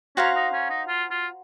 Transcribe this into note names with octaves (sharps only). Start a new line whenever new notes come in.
C#4 F#4 C5 F5 A#5
D#4
C#4
D#4
F4
F4